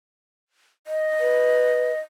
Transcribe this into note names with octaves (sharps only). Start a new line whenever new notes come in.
D#5
B4